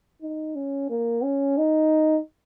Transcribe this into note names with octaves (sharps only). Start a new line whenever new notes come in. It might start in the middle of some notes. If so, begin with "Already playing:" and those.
D#4
C#4
A#3
C#4
D#4